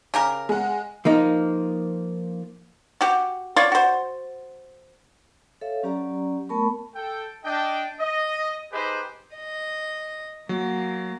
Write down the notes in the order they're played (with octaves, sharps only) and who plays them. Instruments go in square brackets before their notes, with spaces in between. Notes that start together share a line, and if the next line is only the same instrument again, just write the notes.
[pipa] C#3 G4 A#4
[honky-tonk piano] G#3 F#5
[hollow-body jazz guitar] F3 A#3 D#4
[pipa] F#4 G4
F4 C#5 D5
F#4 C5
[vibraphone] A4 C#5 E5 F5
F#3 C#4 G4 D5 A#5
A3 B3 A#4 A5 B5 C#6
[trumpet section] A4 G5
D4 D#5 G5
D#5
D#4 G4 G#4 B4 C5 D#5
[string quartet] D#5
[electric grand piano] F#3 [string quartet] A#3